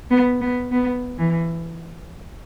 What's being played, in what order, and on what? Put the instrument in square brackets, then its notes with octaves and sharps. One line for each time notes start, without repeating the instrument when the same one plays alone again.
[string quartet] B3
B3
B3
E3